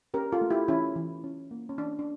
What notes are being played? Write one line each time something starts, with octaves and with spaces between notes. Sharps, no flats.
C#4 G4 A#4
F4 A4
A3
E4 G4
E3 C#4 E4
E3
C#4
A#3
C#4
E3 D4
D4